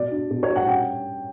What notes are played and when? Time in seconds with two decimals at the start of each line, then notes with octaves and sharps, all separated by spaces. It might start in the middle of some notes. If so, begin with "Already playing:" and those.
Already playing: B2 D5
0.12 D4
0.30 B2
0.43 C#5
0.49 G3
0.56 F#5
0.67 C#4 G5